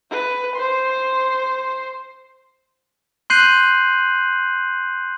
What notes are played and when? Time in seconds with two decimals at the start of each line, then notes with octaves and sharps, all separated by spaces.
0.10 B4
0.55 C5 C6
3.30 C6 F#6 G6 C7 D#7 F#7